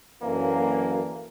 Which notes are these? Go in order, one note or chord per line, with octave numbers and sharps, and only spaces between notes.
F#2 D3 E3 A#3